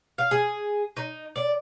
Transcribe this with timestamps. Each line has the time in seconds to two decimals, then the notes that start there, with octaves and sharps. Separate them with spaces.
0.18 F5
0.31 G#4
0.97 D#4
1.36 D5